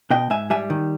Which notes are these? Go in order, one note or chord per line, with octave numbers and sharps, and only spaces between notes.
B2 D#5 G5
G#2 E5 G#5
G3 E5 G#5
D#3